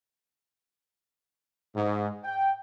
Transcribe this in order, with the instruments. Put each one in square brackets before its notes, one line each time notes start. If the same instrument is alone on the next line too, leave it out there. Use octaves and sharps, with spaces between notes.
[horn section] G#2
G5